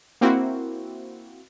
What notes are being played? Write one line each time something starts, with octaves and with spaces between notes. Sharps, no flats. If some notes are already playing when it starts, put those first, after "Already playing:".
A#3 C4 E4 F#4